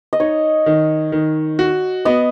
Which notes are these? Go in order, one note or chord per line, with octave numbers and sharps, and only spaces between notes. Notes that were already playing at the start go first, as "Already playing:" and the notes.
D#5
D#4 C#5
D#3
D#3
F#4
B3 D#5